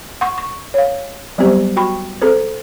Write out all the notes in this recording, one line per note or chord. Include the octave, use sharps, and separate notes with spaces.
F#5 C6 C#6
C#6
C#5 F5
F#3 G3 B3 C4 G4 C5
F#4 G5 B5 C#6
C4 G#4 A4 C5